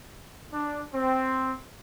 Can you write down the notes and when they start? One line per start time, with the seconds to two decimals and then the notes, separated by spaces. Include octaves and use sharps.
0.52 D4
0.93 C4